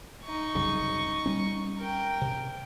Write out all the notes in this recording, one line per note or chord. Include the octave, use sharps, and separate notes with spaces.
D#4 C#6
C2 F#2 C#3
G3 A3 C#4
A#4 G5
C3